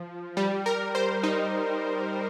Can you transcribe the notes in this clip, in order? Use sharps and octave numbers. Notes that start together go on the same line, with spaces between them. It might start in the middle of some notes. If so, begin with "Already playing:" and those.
Already playing: F3
G3
A#4
C5
D#4